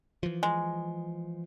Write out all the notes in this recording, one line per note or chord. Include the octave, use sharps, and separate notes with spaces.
E3 F3
G#3